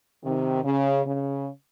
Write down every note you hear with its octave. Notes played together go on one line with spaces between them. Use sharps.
C3 D#3
C#3
C#3